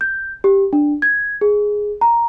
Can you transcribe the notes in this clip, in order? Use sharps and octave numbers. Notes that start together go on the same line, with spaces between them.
G6
G4
D4
G#6
G#4
A#5